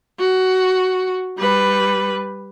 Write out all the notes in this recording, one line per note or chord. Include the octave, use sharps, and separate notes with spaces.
F#4
G3 B4